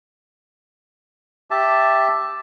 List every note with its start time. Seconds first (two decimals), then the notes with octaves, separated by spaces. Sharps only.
1.51 G4 E5 A5